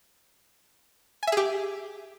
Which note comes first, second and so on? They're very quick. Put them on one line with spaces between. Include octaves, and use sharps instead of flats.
G#5 E5 G#4 G4